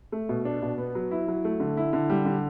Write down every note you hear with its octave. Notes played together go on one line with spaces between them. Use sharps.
A3
B2
D4
B2
B3
F#3
E4
F#3
A3
D3
E4
D3
G3
D3